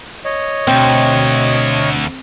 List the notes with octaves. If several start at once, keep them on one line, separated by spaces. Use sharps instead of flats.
C#5 D#5
D2 B2 C4